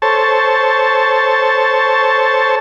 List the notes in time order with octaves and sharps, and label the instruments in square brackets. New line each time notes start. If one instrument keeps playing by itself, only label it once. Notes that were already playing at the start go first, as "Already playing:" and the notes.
[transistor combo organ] A4 C5 C#5 A5